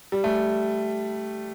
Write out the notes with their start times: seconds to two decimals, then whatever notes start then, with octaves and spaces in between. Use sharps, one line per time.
0.12 G3
0.24 A3